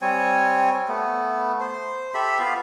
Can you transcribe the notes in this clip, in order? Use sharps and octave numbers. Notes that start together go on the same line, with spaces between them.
G3 C4 C#5 G#5
A3 B3
C5
G4 A4 E5 B5
B3 F4 F5